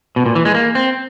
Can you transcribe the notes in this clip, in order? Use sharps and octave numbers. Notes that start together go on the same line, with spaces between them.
B2
A#2
E3
G#3
A#3
C4